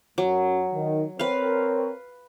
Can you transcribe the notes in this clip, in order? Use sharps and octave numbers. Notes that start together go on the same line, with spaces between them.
F#2 F#3
D#3
C4 A#4 B4 C#5 F5